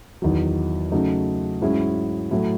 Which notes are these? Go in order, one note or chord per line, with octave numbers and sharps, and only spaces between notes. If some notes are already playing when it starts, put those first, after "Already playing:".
E2 D#3 F#3
C#3 F#3 A3 D#4
G#2 F#3 C#4 E4 G#4
A2 F#3 A3 E4